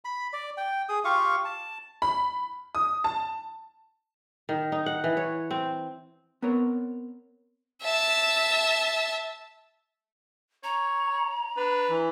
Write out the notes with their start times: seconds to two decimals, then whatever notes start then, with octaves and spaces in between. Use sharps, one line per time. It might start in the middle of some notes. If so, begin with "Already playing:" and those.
0.05 B5
0.33 D5
0.57 G5
0.89 G#4 D#6
1.05 F4 G4 F5 C#6
1.45 A5
2.02 B5
2.75 D#6
3.04 A5
4.49 D#3
4.72 D#4
4.86 F#5
5.04 E3
5.17 C#5
5.51 C4
6.42 B3 C4 A#4 C#5
7.83 E5 A5
10.64 C#5 A#5
11.57 D4 B4
11.89 E3